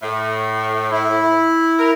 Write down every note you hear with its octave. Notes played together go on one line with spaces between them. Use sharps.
A2
E4
A#4